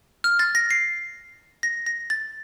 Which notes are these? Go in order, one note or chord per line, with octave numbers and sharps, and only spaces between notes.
F6
A6
A#6
C7
A#6
A#6
A6